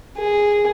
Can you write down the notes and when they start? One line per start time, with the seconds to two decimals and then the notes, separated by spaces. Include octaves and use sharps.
0.18 G#4